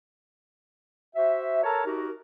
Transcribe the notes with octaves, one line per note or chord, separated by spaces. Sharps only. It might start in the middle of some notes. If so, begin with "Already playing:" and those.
F#4 C5 E5
A4 A#4 C#5 A5 A#5
D#4 F#4 G4 A#4